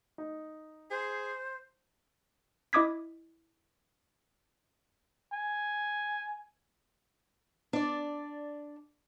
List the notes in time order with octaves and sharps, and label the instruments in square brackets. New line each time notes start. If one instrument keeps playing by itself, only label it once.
[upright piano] D#4
[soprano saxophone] G#4 [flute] C5
[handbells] E4 D#5 D6 D#6 G#6 B6
[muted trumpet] G#5
[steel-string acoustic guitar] D4 D5